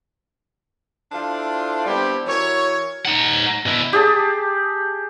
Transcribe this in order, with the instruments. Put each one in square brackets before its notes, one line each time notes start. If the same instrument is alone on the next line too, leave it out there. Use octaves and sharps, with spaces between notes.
[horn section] D4 E4 F4 A4 C5 D5
G3 B3 C4 D4 E4 G4
E3 F#4 A#4 C#5
[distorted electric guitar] D#4 F#5
B2 E4
[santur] G4 G#4 A5